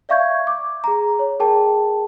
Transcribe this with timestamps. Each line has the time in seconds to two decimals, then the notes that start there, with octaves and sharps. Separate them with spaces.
0.09 D5 E5 F5 C#6 G6 G#6
0.47 D6
0.84 G#4 A#5
1.19 C#5
1.40 G#4 A#4 G5 A5